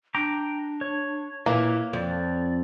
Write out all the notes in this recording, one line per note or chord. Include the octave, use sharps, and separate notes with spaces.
D4 G5 A#5 D6
C#5
A#2 E3 A#3 E5
F2 D5